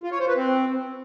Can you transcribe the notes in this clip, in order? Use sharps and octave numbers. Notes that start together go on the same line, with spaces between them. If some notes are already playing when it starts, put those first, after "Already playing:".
F4
C#5
C5
B4
C4